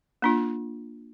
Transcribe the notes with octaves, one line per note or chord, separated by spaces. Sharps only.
A#3 D4 F4